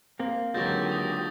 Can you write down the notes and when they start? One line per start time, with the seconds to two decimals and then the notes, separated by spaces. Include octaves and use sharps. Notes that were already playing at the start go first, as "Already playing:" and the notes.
0.19 A#3 C4
0.55 C#2 D3 D#3 F#3 G4 G6 A6 A#6
0.92 D#6